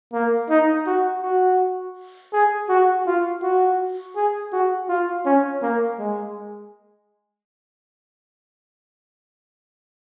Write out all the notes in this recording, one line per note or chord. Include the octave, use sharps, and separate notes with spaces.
A#3
D#4
F#4
F#4
G#4
F#4
F4
F#4
G#4
F#4
F4
C#4
A#3
G#3